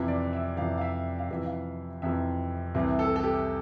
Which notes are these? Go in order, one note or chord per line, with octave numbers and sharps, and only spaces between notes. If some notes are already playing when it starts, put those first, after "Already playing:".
Already playing: F2 C3 E3 E5
D5
E5
F2 C3 E3 F5
F5
E5
F5
F2 C3 E3 E5
F5
F2 C3 E3 E5
C2 C3 E3
A4
A4
G4